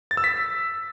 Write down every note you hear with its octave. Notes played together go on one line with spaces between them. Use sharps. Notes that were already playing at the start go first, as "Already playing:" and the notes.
A6
E6
B6